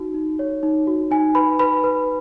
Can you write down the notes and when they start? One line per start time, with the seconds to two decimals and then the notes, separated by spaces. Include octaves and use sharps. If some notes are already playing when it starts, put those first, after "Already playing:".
Already playing: D#4 F#4
0.14 D#4
0.39 C#5
0.63 D#4
0.87 F#4
1.11 D#4 G#5
1.35 B4 B5
1.59 B4 B5
1.84 B4